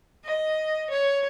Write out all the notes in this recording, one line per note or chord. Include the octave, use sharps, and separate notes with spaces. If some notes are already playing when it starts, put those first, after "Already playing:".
D#5
C#5